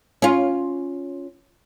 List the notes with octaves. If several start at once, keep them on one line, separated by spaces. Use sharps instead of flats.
C#4 F4